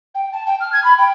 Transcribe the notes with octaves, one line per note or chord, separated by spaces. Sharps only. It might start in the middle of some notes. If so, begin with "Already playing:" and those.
G5
A5
G5
F6
G#6
B5
G5